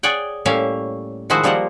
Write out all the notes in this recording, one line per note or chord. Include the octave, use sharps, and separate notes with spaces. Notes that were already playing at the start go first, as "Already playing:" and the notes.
G#4 C#5 D5 F#5 G5
A2 G3 A#3 C#4 E5 F5
D#3 F3 G#3 E4 F#4 C5
F3 G3 A#3 A#4 C5 F#5